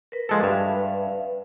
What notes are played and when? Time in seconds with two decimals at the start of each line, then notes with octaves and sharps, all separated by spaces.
0.12 A#4 B4
0.29 F3 G#3 A4
0.43 G2 B4 E5 F5